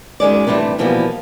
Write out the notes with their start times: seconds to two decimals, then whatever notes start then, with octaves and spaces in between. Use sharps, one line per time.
0.20 F#2 D#3 G#3 D5
0.47 C3 E3 G3 A3 D4
0.78 B2 E3 F3 G3 A#3 B3